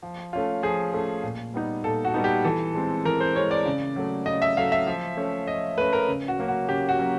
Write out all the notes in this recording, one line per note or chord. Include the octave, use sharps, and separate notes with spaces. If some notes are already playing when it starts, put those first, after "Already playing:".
F3
A3 C#4 F4
F3 G#4
A3 C#4 F4
A#2
G3 B3 D#4
A#2 A4
F#4
G3 B3 D#4
G4
E3 A4
G#3 C4
E3 A#4
C5
G#3 C4 C#5
D5
C#3
F#3 A3
C#3 D#5
E5
F#3 A3 F5
E5
F3
A3 C#4
F3 D#5
A3 C#4 B4
A#4
C#3
F#4
F#3 A#3 C#4
F#4
C#3 G4
F#4
F#3 A#3 C#4